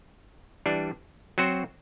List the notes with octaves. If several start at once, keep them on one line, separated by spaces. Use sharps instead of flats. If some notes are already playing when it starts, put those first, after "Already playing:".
E3 G3 D4
F#3 C4 F#4 C5